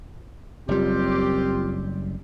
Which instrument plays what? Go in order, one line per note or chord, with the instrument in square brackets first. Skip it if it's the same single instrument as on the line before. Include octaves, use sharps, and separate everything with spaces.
[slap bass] F#1 G3 [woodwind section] C4 F4 G4